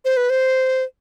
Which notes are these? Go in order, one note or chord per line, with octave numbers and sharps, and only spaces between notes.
C5
B4
C5